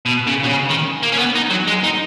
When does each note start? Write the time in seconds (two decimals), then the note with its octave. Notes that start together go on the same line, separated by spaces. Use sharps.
0.06 B2
0.27 C#3
0.44 B2
0.49 C#3
0.70 D#3
1.03 A#3
1.12 C#4
1.19 B3
1.36 D#4
1.51 F#3
1.68 G#3
1.84 D#4